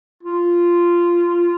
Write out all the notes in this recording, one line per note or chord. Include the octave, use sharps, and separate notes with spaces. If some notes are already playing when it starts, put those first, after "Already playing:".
F4